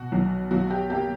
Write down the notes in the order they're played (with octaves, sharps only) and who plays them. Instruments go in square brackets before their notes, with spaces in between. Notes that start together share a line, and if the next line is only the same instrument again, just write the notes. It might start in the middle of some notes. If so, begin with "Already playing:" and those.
Already playing: [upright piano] B2 [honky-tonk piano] F#4
[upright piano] B1
[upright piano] B1 [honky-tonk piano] F#4
[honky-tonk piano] G4
[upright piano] A#3 [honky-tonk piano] G4